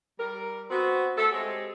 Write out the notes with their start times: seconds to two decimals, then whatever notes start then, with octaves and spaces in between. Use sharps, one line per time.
0.18 G3 A#4
0.70 B3 C4 F#4
1.17 A3 A4
1.32 G#3 C4 G4 G#4 C#5